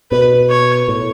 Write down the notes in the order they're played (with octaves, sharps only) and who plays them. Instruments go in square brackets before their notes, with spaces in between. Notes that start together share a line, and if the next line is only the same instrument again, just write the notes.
[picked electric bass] B2 [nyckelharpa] B4
[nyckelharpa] C#5
[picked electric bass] A2